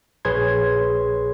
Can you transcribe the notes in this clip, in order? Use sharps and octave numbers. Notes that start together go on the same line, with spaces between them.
A#1 G#4 B4 C#5 C6 G#6